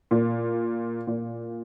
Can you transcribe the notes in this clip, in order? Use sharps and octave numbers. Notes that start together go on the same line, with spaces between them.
A#2
A#2